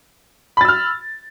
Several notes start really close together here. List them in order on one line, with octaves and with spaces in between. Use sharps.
B5 A6 E6 F6